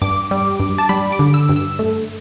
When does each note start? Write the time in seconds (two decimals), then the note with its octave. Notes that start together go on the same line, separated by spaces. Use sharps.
0.02 G2 D6
0.31 G3
0.60 G2
0.78 A5
0.89 G3 B5
1.12 D6
1.19 D3
1.34 E6
1.49 G2
1.56 E6
1.79 A3